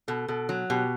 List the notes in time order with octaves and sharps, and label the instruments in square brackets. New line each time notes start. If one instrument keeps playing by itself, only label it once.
[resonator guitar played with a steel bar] B2 [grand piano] A4
[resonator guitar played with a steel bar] B2 [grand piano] A4
[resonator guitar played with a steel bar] F#3
[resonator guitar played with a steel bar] B2 [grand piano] G4